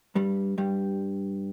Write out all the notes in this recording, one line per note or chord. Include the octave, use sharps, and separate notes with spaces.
G2 G3
G2 G3